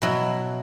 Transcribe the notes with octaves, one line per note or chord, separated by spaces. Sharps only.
B2 F#3 E4